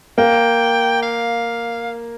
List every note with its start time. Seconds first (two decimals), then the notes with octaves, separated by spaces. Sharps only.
0.18 A#3 G5
1.02 F5